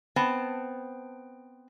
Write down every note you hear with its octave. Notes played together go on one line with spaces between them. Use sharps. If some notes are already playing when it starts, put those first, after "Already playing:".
B3 C4 A5